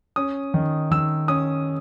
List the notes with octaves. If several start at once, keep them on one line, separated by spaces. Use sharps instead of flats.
C#4 D#6
D#3
D#3 E6
C#4 D#6